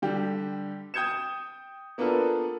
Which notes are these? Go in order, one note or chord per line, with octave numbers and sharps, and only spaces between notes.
D3 G3 G4
G5 D#6 G6 G#6 C#7 E7
A#3 B3 D4 F4 A4 B4